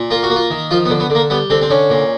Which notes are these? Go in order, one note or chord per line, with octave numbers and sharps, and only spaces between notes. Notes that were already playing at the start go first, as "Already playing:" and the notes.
Already playing: A#2
A#3 F4
F#4
A#3
F4
D#3
F3 F4
B3
D3
B3
D3
A#3
G3 B3
D3 C4
C4
D3 C#4
A#2